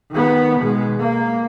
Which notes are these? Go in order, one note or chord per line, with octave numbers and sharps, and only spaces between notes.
D#3 B3
B2 G#3
A#3